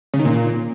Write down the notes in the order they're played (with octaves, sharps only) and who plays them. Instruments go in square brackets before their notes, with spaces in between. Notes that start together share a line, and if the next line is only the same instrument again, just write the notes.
[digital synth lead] C#3
D#3
A#2